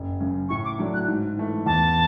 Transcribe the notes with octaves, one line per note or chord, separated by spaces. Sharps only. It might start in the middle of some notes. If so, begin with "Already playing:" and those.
Already playing: F#1
F#2 C#3
A2 C#6
D6
F#3 A3 D4
F#6
G#2
E3 A3
E2 A5